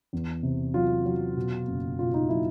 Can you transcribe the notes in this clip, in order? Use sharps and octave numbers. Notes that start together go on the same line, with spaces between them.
E2
C3
F#3 F4
F#3
B2
F#1
B2 F4
D#4
F#3 E4